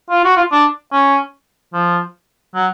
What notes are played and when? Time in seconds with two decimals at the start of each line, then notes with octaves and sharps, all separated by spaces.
0.10 F4
0.25 F#4
0.37 F4
0.52 D4
0.92 C#4
1.73 F3
2.55 F#3